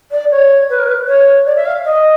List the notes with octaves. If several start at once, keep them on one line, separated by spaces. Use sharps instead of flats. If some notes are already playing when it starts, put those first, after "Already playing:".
D5
C#5
B4
A#4
B4
C#5
D5
E5
F5
D#5